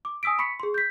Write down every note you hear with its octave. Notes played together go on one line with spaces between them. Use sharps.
D6
G#5 D#6 E6 B6 D7
B5 C#6 B6 C#7
G#4 C6
G6 B6